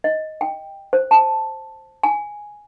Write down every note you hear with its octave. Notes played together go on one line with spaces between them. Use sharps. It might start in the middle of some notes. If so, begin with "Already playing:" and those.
D#5
G5
C5
A5
G#5